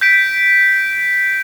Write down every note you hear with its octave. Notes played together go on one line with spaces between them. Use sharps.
G6 B6 D7